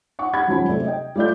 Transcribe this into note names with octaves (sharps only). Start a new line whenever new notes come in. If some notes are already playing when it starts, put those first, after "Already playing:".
F#5 C#6
G4 F#5 B5 G#6
D#1 F2 F#3 C#4 F#4 B5
C3 A3 D5
D#5 G5
G3 A3 F4 D5 G6